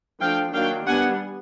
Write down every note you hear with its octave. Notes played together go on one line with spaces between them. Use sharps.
F3 A3 D4 F5 G5
D#3 F#3 A#3 D4 F5 G5
G3 B3 D4 F#5 G#5